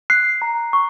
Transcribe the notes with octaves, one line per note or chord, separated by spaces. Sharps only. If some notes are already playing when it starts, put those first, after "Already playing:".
F#6 C7
A#5
C#6